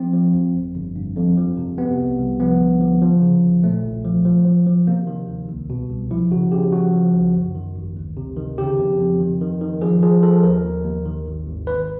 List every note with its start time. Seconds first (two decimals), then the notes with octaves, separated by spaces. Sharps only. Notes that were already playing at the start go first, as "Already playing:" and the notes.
Already playing: F3 C4
0.13 F3
0.34 F2
0.55 G1
0.75 G1
0.96 G2
1.16 F2
1.37 F3
1.57 C3
1.78 C3 B3
1.99 C2
2.19 C2
2.40 F3 B3
2.61 D3
2.81 F3
3.02 F3
3.22 C#3
3.43 G1
3.63 A#2 A3
3.84 B1
4.05 F3
4.25 F3
4.45 F3
4.67 F3
4.87 C3 A#3
5.07 D#3
5.28 D2
5.49 C2
5.70 B2
5.90 C2
6.11 F3 E4
6.31 C#3 F#4
6.52 C#3 G4
6.72 F3 F#4
6.93 F3
7.13 C2
7.35 F#2
7.55 D#3
7.76 G#1
7.97 D2
8.17 C3
8.37 D#3
8.58 C#3 G4
8.78 F2
8.99 F2
9.20 D#3
9.41 D#3
9.61 D#3
9.81 F3 G#4
10.03 F3 G#4
10.23 F3 A4
10.43 D#2 A#4
10.64 D#2
10.85 D#2
11.05 D#3
11.26 G#1
11.46 G#1
11.67 G#1 B4